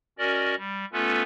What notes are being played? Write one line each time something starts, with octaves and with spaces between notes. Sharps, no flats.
C#4 F#4 A#4 D5 D#5
G3
A3 B3 C#4 F4 A4 B4